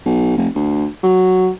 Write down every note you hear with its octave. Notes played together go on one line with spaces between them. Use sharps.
B1
F1
D2
F#3